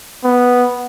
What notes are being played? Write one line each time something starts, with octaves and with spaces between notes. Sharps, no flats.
B3